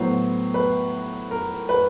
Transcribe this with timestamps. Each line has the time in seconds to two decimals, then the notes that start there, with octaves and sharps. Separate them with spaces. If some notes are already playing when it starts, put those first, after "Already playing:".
Already playing: A2 F#3 B3 C5
0.54 B4
1.31 A#4
1.69 B4